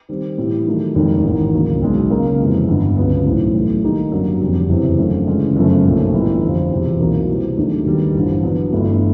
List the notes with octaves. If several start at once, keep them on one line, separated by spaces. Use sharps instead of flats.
D#3 G3 C4
A2 E3 G3
D#3 F#3 A3
F1 D#2 D#3 G#3 C#4
A1 G#2 D#3
D2 C#3 F#3 A#3
B1 B2 G#3
C#3 F#3 A#3
F2 C3 E3 G#3
G1 G2 D3
C#2 C#3 F#3 B3
B1 A2 E3 A3 C4
B1 A2 F#3 A3
D#3 G3 A#3 D#4 G4
G#1 F#2 D3 F#3 A#3
F1 F2 D3 G3
F#1 E2 C3 E3
F#2 D3 F3 A3 C#4
C#3 E3 G#3 C#4
G1 F#2 C#3 F3 A3
B1 A#2 F3 A3
G1 G2 E3
F2 D3 G3 C4 F4
E1 E2 C3 F3
C2 B2 F#3 A#3 D#4
C3 E3 G3
D#2 D#3 F#3 A3 D4
D#2 D#3 G3 B3
A1 G2 D3 F3
D3 F#3 B3
G1 G2 E3 A3